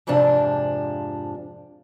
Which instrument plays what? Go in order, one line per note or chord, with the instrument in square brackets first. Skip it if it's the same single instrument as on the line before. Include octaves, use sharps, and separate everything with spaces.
[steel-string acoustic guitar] F2 G#2 C3 F3 D4